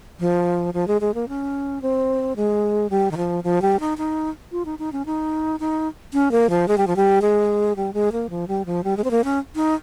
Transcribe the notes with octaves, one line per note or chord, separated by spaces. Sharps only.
F3
F3
G#3
G#3
A#3
C#4
C4
G#3
G3
D#3
F3
F3
G3
D#4
D#4
F4
D#4
D#4
C#4
D#4
D#4
C#4
A#3
F3
G#3
G3
F3
G3
G#3
G3
G#3
A#3
F3
G3
F3
G3
G#3
C4
A#3
C#4
D#4